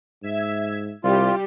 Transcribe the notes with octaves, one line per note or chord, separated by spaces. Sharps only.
G#2 E5 G#6 E7
C2 G3 F4 G4